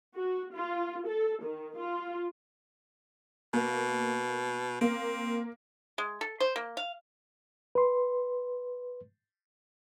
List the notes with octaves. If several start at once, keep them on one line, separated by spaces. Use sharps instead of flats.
F#4
F4
A4
D#3
F4
B2 A#3
A#3 C4
G#3
A4
C5
A#3
F5
B4 C6